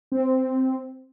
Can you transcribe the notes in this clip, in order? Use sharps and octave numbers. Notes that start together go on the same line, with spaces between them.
C4